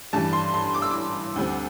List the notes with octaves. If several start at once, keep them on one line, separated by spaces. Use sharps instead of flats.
G2 E3 G3 A5
C6
C6
D6
E6
D6
D2 D3 G3 C4